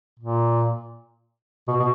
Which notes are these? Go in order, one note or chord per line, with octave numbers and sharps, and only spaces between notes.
A#2
B2
B2